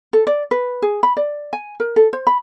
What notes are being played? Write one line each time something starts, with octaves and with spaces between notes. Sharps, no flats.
A4
D5
B4
G#4
B5
D5
G#5
A#4
A4
C5
B5